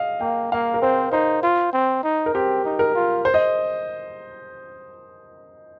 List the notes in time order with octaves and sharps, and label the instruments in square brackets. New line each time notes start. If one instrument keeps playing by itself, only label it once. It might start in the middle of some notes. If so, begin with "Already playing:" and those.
Already playing: [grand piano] D#5 F5
[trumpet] A#3 [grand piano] G5
[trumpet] A#3 [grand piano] F5
[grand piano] A#4
[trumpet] C4 [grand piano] C5
[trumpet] D#4 [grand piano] C5
[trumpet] F4
C4
D#4
[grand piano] A#4
[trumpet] C4 [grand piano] G4
[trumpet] D#4
[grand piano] A#4
[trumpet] F4
[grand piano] C5
D#5